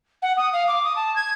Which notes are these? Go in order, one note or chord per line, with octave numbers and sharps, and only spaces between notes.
F#5
D#6
F5
D6
D#6
A5
G#6